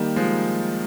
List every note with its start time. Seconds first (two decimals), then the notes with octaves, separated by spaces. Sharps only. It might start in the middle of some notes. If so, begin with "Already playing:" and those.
Already playing: D#3 G3 A#3 D#4 G4
0.16 F3 G#3